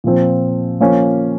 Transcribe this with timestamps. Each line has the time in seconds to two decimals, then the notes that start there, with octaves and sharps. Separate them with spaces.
0.04 A#2 F3 C4
0.80 F3 A#3 C#4